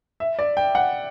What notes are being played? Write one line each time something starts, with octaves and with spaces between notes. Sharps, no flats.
E5
D5
G5
F#5